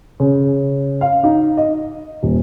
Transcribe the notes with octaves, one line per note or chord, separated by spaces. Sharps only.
C#3
F5
D#4
D#5
D#1